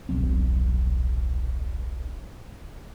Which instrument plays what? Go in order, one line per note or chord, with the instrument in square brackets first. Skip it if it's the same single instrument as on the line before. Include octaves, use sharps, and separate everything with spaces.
[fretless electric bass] D#1 B1 F#3 C4